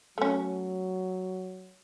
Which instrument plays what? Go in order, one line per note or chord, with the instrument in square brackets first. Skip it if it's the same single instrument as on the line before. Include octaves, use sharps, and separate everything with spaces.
[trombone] F#3 [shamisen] A3 C#4